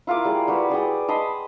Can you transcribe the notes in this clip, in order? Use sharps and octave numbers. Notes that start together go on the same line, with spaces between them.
E4 F4 A#4 D6
G3 G#4 D5
G3 F#4 B4
G#4 D5 G5 D#6
D#5 A5 B5 C6